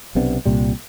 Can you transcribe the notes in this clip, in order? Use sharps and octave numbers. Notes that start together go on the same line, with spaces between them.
B1 C3 B3 D4
C2 A#2 G3